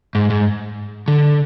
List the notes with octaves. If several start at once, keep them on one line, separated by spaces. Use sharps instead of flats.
G#2
G#2
D3